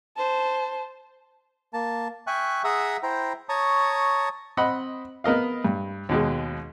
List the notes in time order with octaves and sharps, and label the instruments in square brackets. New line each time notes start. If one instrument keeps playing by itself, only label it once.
[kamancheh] C5 A5
[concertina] A#3 A5
E5 G5 G#5 C#6 F#6
G#4 E5 F#5 A#5 D#6 E6
E4 C5 G5 A#5
C#5 A5 A#5 C#6 D#6
[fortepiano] C4 D#5 F#5 B5
B3 A#4 D#5 F5
G2
D#2 B2 G#3